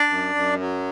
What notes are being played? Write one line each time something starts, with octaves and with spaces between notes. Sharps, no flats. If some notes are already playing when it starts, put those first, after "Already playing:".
Already playing: D4 D5
F#2
F#2
F#3